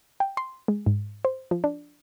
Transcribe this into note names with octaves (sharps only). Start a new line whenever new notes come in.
G5
C6
G#3
G#2
C5
F3
D4